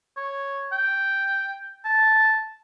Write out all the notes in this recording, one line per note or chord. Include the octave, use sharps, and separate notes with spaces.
C#5
G5
A5